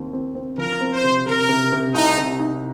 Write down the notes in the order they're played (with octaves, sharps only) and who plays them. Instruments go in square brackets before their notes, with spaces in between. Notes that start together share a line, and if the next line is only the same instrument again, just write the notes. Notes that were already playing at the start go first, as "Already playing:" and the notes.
Already playing: [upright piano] D#2 C4
C4
C4
[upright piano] F3 [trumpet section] A#4
[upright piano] C4
[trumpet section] C5
[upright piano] C3
[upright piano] C3 [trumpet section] A#4
[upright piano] C3
C3
[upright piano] C2 [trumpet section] D#4
[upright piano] C3
D#4